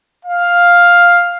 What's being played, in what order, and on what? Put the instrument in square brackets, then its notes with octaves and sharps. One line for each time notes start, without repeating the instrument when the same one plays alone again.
[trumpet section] F5